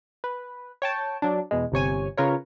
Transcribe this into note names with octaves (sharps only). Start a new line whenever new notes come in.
B4
C#5 G5 A5
F#3 D4
E2 B2 G#3
G1 C3 C#5 G#5
C#3 F4 A#4 B4 C#5